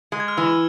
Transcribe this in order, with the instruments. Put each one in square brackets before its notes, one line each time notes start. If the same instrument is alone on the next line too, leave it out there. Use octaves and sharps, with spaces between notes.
[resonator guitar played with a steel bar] G#3
[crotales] G#6
F6
[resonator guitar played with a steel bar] E3 [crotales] E6